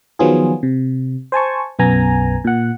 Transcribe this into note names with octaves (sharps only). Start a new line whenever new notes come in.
D#3 F3 F#3 B3 F4 G#4
C3
C5 G#5 A5 C#6
B1 F#2 B3 G#5 A#5
A#2 F#5